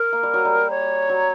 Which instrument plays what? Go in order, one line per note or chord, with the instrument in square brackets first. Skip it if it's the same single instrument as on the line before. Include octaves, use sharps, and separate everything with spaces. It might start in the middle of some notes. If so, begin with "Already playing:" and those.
Already playing: [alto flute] A#4
[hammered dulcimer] A#3
G3
F#3
G3
[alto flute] C#5
[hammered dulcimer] F#3